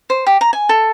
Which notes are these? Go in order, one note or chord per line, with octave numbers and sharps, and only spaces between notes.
C5
G4
A#5
G#5
A4